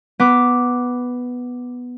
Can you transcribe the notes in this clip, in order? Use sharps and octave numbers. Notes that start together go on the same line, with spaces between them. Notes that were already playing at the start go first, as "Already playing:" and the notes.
B3 D6